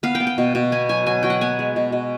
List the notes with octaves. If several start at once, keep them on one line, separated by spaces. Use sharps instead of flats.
B3 F5
G5
B3
G5
B2
B2
B3 G#5
F#3 G#5
F#3 G#5
F#3 G5
F#5
B3 G#5
G#3
B2
B2